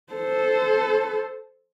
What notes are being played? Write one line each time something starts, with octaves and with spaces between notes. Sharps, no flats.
A4 C5